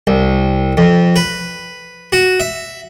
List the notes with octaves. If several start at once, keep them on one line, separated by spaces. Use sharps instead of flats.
C2
F2
B4
F#4
E5